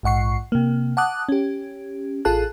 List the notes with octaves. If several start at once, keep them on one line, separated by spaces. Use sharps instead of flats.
A#1 G#2 F#5 C#6 C7
C3 A#3
F#5 A5 D6 D#6 F#6
C#4 G4
A1 F4 G#4 A4 A5 F#6